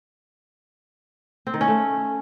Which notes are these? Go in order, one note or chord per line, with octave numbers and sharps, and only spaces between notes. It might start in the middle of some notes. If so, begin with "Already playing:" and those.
C4
D#3
C#4
A3